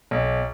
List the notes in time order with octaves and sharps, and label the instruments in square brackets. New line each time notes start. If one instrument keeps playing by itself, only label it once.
[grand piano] B1